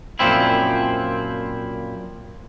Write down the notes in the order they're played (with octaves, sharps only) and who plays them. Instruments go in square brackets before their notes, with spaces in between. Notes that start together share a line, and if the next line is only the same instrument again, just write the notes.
[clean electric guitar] F#2 A#2 F3 C4 E4